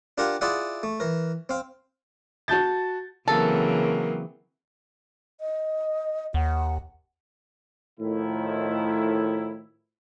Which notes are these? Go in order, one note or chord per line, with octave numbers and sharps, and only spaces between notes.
D4 F4 G4 A#4 F5 F#5
E4 F4 G#4 D5 E5 F#5
A3
E3 A#4
C4 F5
F#4 A5 G6 A6
C#3 E3 F#3 A#3 C4 A4 A#4
D#5
D#2 F#5
A2 D#3 F3 E4